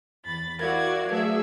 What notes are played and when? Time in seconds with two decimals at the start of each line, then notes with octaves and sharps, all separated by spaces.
0.25 E2 B5 A6
0.59 E4 F#4 A#4 D5 F5 G#6
1.09 F#3 A3 G#4 B4 E5